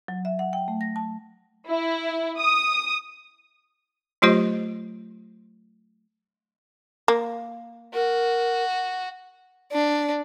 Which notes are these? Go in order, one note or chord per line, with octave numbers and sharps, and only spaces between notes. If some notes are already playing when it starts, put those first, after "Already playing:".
F#3
E5
F#5
G5
A3
A#6
A5
E4
D#6
F#3 A3 F4 G4 C5 D#5
A#3
F#4 A#4
D4